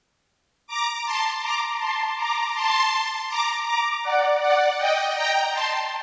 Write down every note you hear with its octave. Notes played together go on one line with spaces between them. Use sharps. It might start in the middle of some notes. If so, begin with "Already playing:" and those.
A#5 D6
A5 C6
A#5 D6
A5 C6
A#5 D6
A5 C6
A#5 D6
A#5 D6
D5 F#5
D5 F#5
D#5 G5
G5 A#5
A5 C6